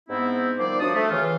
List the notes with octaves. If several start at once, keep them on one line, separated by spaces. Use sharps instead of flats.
G#2 B3 C4 E4
D#3 F3 G3 C5 D5
F#2 F3 D4 F#4 A5 D#6
A3
C#3 E3 F4